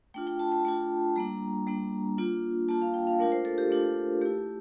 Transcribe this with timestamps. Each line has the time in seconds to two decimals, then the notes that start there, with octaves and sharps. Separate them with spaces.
0.14 A3 D4 F4 G5
0.27 G5
0.39 A5
0.52 A5
0.65 A3 D4 F4 A5
1.16 G3 A#3 D4 A#5
1.67 G3 A#3 D4
2.18 A#3 D4 F4
2.69 A#3 D4 F4 A5
2.82 F5
2.94 G5
3.07 F5
3.19 A3 D4 F4 A#4
3.32 C5
3.45 A4
3.58 G4
3.71 A3 D4 F4
4.21 A3 E4 G4